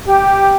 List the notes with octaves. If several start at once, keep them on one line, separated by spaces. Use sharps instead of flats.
G4